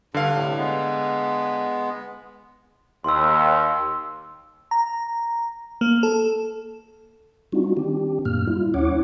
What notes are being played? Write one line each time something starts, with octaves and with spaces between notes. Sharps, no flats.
G2 D3 F5
A2 C3
G#3 B3
D#2 C6 E6
A#5
A#3
A4
G3 C4 D4 D#4 F4 F#4
D#3 C4 D4 G4
F#2 A#2 A#3 F6
G3 E4 F4
D#2 C#4 E4 C#5 F#5 D6